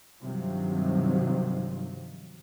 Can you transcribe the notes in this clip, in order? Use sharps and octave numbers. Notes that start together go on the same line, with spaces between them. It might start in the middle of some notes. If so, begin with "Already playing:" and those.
G2 C3 D#3 F3 F#3